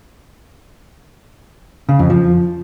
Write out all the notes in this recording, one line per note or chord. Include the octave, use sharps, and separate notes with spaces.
C#3
F2
F3